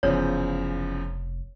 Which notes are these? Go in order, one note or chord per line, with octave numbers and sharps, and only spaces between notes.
F1 E2 C#3 F3 C#5